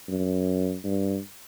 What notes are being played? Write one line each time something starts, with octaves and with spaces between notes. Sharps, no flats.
F#2
G2